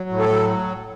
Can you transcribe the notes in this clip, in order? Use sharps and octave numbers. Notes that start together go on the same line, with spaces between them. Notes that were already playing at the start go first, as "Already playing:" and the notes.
Already playing: F#3
A2
A4
F#3